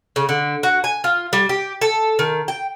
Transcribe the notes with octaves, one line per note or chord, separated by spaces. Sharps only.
C#3
D3
F#4
G#5
F4
G3
G4
A4
D#3
G5